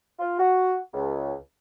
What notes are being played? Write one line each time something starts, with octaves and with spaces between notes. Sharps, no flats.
F4
F#4
C#2